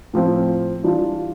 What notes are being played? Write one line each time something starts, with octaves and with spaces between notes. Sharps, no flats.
A2 F3 C4
E3 G3 D4 F4